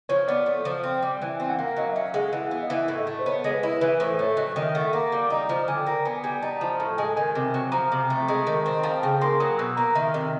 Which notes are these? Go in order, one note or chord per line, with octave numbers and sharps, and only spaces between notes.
F3 C#5
B3 D5
A3
F3
C4
G3
E3
C4
F#5
A#3 F5
F#3 D#5
E5
C#4
F5
G#3 F#5
E3
F5
B3
D#5
E3 E5
A2
D#5
A3
C5
B3 C#5
G#3
B4
E4
E3 B4
A2 C5
A3 C#5
E5
F#3 D#5
D#3 E5
A3 F#5
A#3 F5
G3
D#4
F3
D3 G#5
G5
A#3
B3 G#5
G3 G#5
D#4 A5
F3 A5
A2 A5
G#3 G#5
D#3 G#5
C3
F#3
F3 A#5
C3
A3
G#3
D#3
C4
F3 A5
C#3 G5
A#3 C6
F#3 D#6
B2 E6
A#3 A#5
D#3 E5
C3 D#5